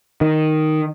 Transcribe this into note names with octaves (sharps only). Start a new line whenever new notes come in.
D#3